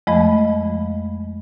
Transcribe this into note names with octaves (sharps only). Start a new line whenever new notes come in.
F2 F3 G#3 A3 D#5 B5